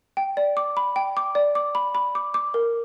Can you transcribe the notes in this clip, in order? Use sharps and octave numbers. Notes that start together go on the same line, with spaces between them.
G5
D5
D6
B5
G5
D6
D5
D6
B5
B5
D6
D6
A#4